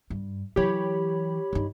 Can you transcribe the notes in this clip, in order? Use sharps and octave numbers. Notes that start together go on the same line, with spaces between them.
G2
E3 F#3 G4 C#5 B5
G2 D#4